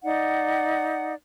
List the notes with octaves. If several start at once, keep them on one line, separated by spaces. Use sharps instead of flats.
D#4 D5 F#5